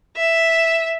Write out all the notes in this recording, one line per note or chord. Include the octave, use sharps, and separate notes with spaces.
E5